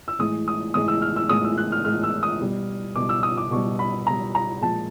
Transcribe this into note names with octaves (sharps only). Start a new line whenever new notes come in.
E6
A2 E3 G#3 D#6
D#6
A2 E3 G#3 D#6
E6
F6
E6
A2 E3 G#3 D#6
E6
F#6
F6
A2 E3 G#3 F6
E6
D#6
B2 G3
B2 G3 D6
E6
D#6
D6
B2 G3 C#6
B5
B2 G3 A#5
A#5
A#2 F3 G#3 A5